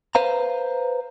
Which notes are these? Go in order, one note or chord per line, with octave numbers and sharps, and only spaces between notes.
B4 C5 F5 A#5